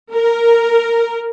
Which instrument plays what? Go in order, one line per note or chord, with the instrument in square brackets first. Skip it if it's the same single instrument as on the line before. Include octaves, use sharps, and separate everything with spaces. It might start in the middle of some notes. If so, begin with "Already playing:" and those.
[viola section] A#4